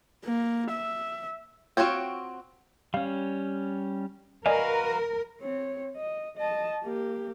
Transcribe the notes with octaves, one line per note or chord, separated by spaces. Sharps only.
A#3
E5
C4 F4 F#4 C#5 G5
G3 C#4 F5
F#4 A#4 B4 D5 D#5 F5 G#5
C4 C#5
D#5
D#5 A5
A#3 G4